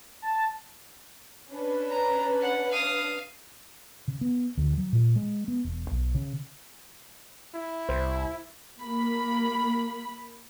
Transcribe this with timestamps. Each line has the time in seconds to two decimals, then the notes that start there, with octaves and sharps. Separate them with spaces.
0.22 A5
1.52 C#4 D4 B4
1.88 A#5
2.41 F#5
2.71 F5 D#6
4.08 C#3
4.21 B3
4.57 D2
4.78 F#3
4.93 A#2
5.16 G#3
5.48 B3
5.64 E1
5.91 B1
6.14 C#3
7.55 E4
7.89 C2 C5
8.79 A#3 B5